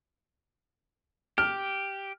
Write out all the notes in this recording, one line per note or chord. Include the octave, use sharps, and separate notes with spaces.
G4 F6